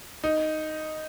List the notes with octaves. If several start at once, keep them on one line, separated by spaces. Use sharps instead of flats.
D#4